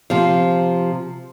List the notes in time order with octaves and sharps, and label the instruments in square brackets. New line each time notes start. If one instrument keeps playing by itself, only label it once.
[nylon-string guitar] C3 F3